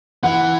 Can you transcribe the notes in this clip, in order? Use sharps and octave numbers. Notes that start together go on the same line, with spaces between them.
E3 F#5